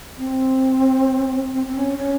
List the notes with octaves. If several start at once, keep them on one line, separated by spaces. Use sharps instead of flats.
C4
C4
C4
C#4
C#4